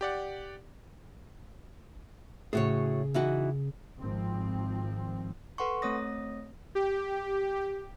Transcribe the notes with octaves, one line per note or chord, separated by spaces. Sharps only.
G4 D5 F#5
A2 C#3 F#4 G#4 C#5
E3 D#4 F#4
G#1 F3 C4
A4 B4 F#5 C6 C#6
A3 C4 C#5 D#6 A#6
G4